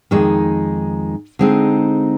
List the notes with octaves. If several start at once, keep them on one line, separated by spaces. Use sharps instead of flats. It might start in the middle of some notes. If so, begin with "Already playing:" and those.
F2 D#3 G#3 D#4
D3 G#3 C4 D#4